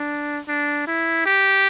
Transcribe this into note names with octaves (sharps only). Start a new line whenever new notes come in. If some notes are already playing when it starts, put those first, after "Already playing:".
Already playing: D4
D4
E4
G4